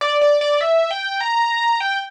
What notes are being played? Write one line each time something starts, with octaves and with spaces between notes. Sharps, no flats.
D5
D5
D5
E5
G5
A#5
G5